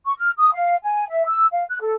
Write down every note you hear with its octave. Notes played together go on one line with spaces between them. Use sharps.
C#6
F6
D#6
F5
G#5
E5
E6
F5
F#6
A4